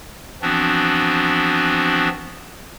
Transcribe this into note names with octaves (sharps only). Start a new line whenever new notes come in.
E3 F3 B3 C4 D4 F#4